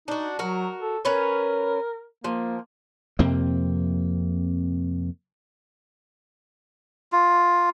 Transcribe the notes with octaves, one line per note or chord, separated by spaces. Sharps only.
D4 D#4 F#4
F#3 F#4 A#4
A4
C#4 A#4 B4 C#5
F3 A#3
F2 C3 A#3 C4
F4